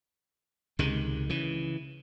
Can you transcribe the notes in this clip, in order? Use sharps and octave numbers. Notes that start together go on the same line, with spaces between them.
C#2 C3 D#3 G#3
C#3 E3